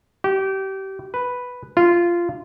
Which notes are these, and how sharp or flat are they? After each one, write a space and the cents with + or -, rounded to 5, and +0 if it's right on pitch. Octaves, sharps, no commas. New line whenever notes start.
G4 -25
B4 +0
F4 -15